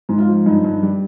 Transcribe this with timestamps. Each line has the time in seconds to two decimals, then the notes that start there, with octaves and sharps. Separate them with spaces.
0.09 G#2
0.18 F4
0.28 F3
0.46 G2 D#4
0.64 G2
0.83 G3